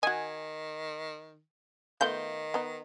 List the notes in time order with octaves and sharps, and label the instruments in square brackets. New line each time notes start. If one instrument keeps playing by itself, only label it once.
[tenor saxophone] D#3 [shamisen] F#4 D#5 [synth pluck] G#5
[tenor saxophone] D#3 [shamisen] A3 B3 F4 [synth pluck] G6
[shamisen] B3 D#4